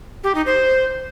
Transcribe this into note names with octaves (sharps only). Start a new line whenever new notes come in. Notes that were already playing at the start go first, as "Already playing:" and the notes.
G4
D#4
C5